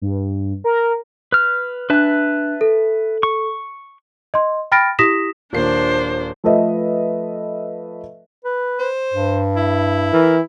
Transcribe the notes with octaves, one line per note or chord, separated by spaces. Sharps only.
G2
A#4
B4 F6
D4 B4 E5 A5 F#6
A4
C#6
D#5 C6
G5 B5 F6 A6 A#6 D7
E4 G4 D#6 A#6 B6 E7
D#1 A#3 D4 C5 C7
F3 A3 A4 B4 D#5 E5
B4
C5
G2
E4
E3 A#4